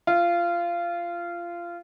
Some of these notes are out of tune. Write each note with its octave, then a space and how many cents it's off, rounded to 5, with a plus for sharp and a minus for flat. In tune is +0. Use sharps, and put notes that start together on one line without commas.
F4 -20